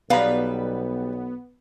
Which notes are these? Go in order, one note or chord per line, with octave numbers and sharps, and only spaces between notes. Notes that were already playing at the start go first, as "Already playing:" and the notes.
B1 G3 B3 B4 F5 A#5